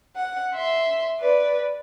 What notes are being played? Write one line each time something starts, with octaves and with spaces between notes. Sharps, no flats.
F#5
E5 C6
B4 D5